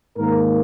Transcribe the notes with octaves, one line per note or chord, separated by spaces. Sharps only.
G#2 D#3 A#3 A#4